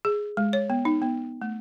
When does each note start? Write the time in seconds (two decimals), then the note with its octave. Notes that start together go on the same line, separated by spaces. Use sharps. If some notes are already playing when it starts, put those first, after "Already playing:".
0.05 G#4
0.37 G#3
0.53 C#5
0.70 B3
0.85 D#4
1.02 B3
1.42 A3